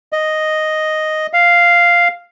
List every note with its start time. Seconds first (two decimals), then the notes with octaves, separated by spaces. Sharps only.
0.13 D#5
1.33 F5